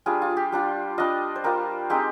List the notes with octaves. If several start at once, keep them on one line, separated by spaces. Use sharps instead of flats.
G3 D4 F4 G#4
F4
G4
G3 D4 F4
G3 D4 F4 D#5
C5
G3 D4 F4 A#4
G#3 C4 D#4 G4